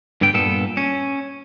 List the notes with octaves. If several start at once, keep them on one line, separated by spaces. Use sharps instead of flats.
G2 D3 B3 G5
G2 A#2 B3 A4
C#4